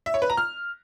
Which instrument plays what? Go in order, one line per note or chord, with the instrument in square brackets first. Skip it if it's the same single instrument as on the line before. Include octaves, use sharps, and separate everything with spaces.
[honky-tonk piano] E5
C#5
B4
A#5
F6